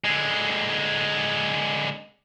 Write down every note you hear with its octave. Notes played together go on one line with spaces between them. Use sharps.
D3 G#3